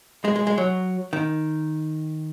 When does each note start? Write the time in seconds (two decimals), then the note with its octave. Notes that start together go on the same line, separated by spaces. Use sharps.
0.24 G#3
0.36 G#3
0.47 G#3
0.58 F#3
1.13 D#3